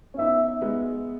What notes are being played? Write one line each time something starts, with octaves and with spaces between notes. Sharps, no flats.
C#4
B3 D#4 E5
G#3 B3